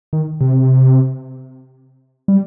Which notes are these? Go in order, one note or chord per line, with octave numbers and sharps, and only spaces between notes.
D#3
C3
G3